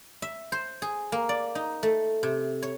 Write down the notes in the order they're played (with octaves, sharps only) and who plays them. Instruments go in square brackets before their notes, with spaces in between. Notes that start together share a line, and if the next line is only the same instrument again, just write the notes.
[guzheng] E5
C5
G#4
A#3
D5
D#4
A3
C3
C#5